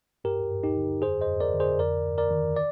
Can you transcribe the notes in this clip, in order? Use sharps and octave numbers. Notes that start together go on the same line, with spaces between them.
G2 G4 A#4
G2
D#4 G4
D3
F2 G#4 C5
C5 D#5
F2
A#4 D5
D3
G#4 C5
F2 A#4 D5
F2
A#4 D5
D#3
D5